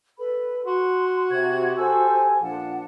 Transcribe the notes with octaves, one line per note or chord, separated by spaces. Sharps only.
A4 B4 B5
F#4 C6
C3 G#6
G4 A4 C5 G#5 E6
A#2 F3 D4 F#5 A5